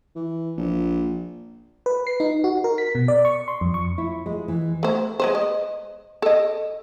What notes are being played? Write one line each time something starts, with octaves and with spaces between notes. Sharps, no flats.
E3
A#1
B4
C7
D#4
F#4
A#4
B6
B2
D5
C#6
C6
F2
C#6
E4
G#3
E3
A3 C5
G#3 B4 C5
D#5
A4 D#5